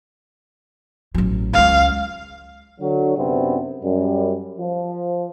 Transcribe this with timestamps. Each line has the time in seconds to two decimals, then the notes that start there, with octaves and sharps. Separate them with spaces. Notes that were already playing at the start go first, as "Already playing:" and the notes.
1.15 A1 F#3
1.54 C#2 F4 F5
2.81 D3 F#3
3.18 F#2 C3 B3 C4 D4
3.83 F#2 G3
4.59 F3